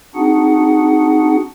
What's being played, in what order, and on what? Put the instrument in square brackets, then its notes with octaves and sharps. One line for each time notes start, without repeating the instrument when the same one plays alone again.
[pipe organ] C4 D4 D#4 F#4 G#4 F#5